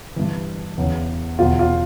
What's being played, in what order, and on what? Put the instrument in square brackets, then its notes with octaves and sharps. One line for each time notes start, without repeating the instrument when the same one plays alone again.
[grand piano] G2 E3
E2 C#3 E3
B2 F4
E2
F4